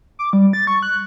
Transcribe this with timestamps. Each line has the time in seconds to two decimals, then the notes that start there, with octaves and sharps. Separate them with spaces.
0.19 D6
0.33 G3
0.53 A6
0.67 C#6
0.83 F#6